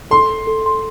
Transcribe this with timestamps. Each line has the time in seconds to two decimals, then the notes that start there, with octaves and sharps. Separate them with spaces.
0.11 A4 C6
0.30 A4
0.47 A4
0.66 C6